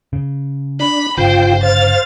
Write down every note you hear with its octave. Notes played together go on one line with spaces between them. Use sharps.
C#3
D4 B5
G1 C#3 F4 C5 G5
C5 F5 A6 F7